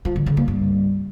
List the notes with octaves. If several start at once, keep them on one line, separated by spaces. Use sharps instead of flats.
F3
D3
C#3
A#3
G2